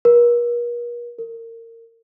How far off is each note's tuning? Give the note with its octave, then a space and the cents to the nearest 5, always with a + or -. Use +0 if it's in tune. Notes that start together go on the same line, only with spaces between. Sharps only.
A#4 +45
A#4 -30